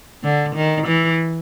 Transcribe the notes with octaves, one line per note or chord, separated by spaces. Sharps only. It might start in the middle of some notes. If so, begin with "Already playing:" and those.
D3
D#3
E3